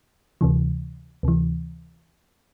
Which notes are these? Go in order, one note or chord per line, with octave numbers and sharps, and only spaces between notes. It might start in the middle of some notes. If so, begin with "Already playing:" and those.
D2 C3 E3
D2 C3 E3